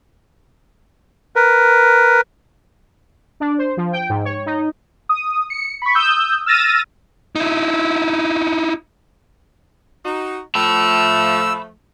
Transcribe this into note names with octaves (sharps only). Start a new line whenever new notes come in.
A#4 B4
D4
C5
F3
G5
G#2
C#5
D#4
D#6
C#7
B5 C#6
D#6 E6 G6
E6 F6 A6 A#6 D#7
D#4 E4
D#4 F#4
F3 A3 A5 B5 E6